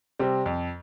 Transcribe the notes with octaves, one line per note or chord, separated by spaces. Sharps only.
C3 G3 C4
F2